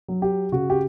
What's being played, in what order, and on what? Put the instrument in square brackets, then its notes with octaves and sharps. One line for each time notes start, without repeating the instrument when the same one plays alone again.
[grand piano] F#3
G4
C#3 F#4
G4